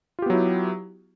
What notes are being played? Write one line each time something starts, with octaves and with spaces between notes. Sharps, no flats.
F#3 B3 E4 F4 G4